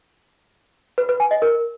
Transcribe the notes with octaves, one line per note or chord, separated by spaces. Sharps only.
B4
B4
G#5
D#5
A#4